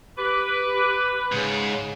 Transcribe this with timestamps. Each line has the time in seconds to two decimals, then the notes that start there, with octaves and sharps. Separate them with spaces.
0.18 G4 B4 D6
1.32 G#2 C#3